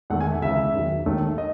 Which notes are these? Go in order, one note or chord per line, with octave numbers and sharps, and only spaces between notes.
E2 D#3 A3 F#5
G#5
E5
C#2 C#3 E3 G#3 E5
E2 D#3 F#3
D#2 D#3 A3
D#5